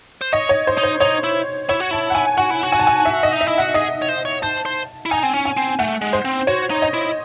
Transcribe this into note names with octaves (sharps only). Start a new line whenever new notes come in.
C5
C#5 D#5
C#5
C5
D#4
C5
D#4 C#5
E4
E4 C#5
F#4
E4 A5
F#5
G#5
F#4 F#5
E4
F#4
G#5
A5
G#5
E5
D#5
D#4
E5
E4
F#4 F#5
G#4 D#5
C#5
C5
C#5
C5 A5
C5
E4
D#4 G#5
C4
C#4
G#5
C4
A3 F#5
G#3
C5
C4
F#4 C#5
D#4
D#5
E4